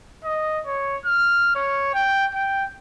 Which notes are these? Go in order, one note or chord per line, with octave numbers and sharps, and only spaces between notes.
D#5
C#5
F6
C#5
G5
G5